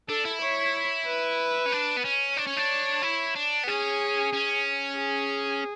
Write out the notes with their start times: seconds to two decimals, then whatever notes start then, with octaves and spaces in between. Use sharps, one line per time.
0.09 D4 A4
0.25 E4
0.42 C#5
1.06 B4
1.66 C#4
1.72 D4
1.97 B3
2.05 C#4
2.37 D4 C#5
2.47 C#4
2.57 D4
3.03 E4
3.35 D4
3.64 B3
3.68 C#4 G#4
4.33 C#4
4.99 G#4